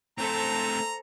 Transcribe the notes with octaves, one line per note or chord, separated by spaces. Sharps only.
A3 C4 A4 C5 A#5